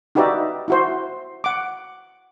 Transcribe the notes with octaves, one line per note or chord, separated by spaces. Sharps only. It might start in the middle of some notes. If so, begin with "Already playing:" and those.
D#4 F#4 G4 B4 D5 E5
E4 F#4 C5
F#5 D6